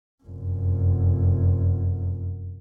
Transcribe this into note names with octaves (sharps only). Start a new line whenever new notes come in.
F1 F#2